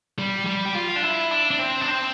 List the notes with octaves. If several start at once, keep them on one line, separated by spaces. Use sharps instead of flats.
G3
G3
G4
F4
D4
E4
D4
D4
C4
D4
C4